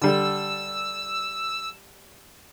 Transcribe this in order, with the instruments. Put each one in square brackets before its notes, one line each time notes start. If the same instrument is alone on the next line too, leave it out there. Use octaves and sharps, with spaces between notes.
[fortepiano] D3 G3 A4 [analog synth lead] E6